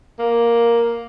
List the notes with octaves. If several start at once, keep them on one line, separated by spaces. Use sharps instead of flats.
A#3